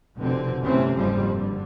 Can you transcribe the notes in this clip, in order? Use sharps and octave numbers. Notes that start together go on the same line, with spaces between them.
F1 B2 D3 C4
G2 C3 E3 A3 C4 C#4
F#1 F2 G#2 F3 G3 C4
G2 D3